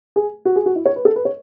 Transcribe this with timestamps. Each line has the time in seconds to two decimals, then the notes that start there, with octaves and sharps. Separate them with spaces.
0.16 G#4
0.45 F#4
0.56 G#4
0.66 F#4
0.76 E4
0.86 C#5
0.96 B4
1.05 A4
1.16 B4
1.25 C#5